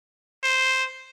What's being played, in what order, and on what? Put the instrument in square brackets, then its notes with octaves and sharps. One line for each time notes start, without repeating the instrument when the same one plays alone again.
[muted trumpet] C5